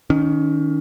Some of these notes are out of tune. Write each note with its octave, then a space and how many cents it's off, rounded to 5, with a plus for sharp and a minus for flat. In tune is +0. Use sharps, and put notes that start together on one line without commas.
D#3 +0 C#4 +30